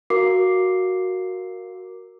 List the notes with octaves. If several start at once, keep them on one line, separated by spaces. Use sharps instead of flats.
F#4 A#4 F5 D6 C7